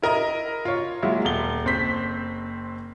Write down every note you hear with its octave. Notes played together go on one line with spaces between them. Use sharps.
E4 A#4 D#5 A#5
F4 C#5
F#3 G#3 A#3 E4 F4
D#1 G7
F#1 C4 C5 B6